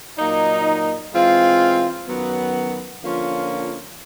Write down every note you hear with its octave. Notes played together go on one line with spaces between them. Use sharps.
A#2 F#3 A#3 D#4
E3 G#3 C4 F4
F#2 D#3 F#3 B3
D3 F3 A#3 C#4 F4